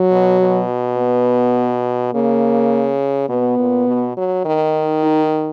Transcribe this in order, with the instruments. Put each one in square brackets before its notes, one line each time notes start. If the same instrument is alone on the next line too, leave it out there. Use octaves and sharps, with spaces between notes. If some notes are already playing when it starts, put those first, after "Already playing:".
Already playing: [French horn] F#3
[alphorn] B2
B2
[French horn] B3
[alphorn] C#3 [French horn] A#3
[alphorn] B2 [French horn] B3
[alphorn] A#2
B2
F#3
[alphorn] D#3 [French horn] D#4
[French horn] D#4